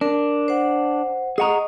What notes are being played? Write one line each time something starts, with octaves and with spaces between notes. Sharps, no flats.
D4 A#4
C5 F#5
G#4 D#5 F#5 A#5 C#6 D#6